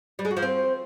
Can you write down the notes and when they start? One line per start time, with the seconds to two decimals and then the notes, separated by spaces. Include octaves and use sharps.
0.19 G3
0.25 G#3
0.31 F#4
0.37 F3
0.42 C4